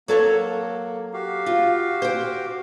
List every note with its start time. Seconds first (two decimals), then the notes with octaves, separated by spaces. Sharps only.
0.08 F#3 A#3 A4 C#5
1.13 F#4 G4 F5
1.46 F4
2.02 C5 G5